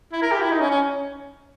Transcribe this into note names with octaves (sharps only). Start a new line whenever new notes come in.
E4
A#4
G4
E4
D#4
C#4
C#4